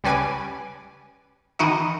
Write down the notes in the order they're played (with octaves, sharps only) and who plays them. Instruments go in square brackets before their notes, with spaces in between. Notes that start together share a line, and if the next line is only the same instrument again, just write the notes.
[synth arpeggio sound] C#2 G3 C#4 B4 G#5 D6
D#3 E3 D#4 F#4 D#5